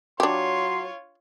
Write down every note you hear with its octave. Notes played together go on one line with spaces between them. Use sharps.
F#3 D4 F4 G4 C#5 C6